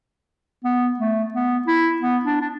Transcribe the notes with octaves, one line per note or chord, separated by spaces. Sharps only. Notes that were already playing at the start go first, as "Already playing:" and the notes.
B3
A3
B3
E4
B3
D4
D4